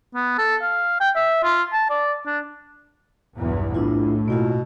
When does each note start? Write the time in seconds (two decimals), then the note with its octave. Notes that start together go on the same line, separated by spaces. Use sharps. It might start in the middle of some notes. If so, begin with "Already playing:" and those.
0.14 B3
0.38 A4
0.62 F5
1.00 G5
1.15 E5
1.44 F4
1.73 A5
1.90 D5
2.26 D4
3.37 B1 E2 G2
3.74 A2 D4 E4 F4
4.28 B2 A#3 E4 F4